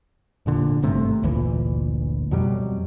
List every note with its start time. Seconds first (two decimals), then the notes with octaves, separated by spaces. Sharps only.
0.46 F1 A#2 D3
0.82 G#1 G2 C3 A3
1.23 G1 D2 A#2 E3
2.31 F2 B2 F#3 G3